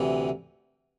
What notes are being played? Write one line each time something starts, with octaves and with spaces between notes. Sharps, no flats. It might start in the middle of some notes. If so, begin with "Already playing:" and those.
Already playing: D2 C3 E3